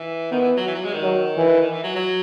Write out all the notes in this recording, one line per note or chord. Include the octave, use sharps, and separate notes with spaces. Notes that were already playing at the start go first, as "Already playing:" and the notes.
Already playing: E3
D#3 B3
E3
F#3
E3
F#3
G#3
D#3
F#3
E3
D#3
E3
F#3
F#3